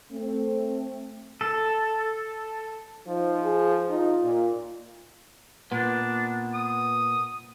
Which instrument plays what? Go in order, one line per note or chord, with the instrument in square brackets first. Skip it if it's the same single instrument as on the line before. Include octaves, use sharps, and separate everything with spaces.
[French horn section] A3 C4
[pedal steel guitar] A4
[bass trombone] F3 [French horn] D#4
[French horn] G#4
[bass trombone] D#4 [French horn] F4
[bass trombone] A#2
[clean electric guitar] A#2 [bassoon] B3 [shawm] D4
[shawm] D#6